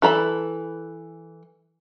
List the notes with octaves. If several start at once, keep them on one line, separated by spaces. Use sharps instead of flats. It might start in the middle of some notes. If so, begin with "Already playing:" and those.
E3 A4 A#5 B5